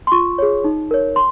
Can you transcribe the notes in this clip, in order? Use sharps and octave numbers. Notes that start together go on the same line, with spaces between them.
C6
F4 C#6
G#4 C#5
D#4
A#4 C#5
C6